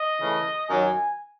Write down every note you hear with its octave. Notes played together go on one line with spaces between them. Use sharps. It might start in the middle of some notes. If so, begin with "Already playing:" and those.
Already playing: D#5
C#3 E3 A3
F#2 D#3 F#3 G#5